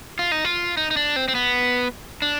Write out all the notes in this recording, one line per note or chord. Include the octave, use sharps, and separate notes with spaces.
F4
D#4
F4
D#4
D#4
D4
C4
C4
B3
D4